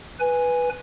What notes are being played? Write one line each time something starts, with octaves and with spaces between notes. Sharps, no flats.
B4 G#5